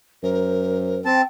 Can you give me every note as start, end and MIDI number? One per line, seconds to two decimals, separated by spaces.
0.23 1.15 42
0.23 1.06 70
0.23 1.00 72
1.05 1.22 60
1.05 1.27 79
1.05 1.22 81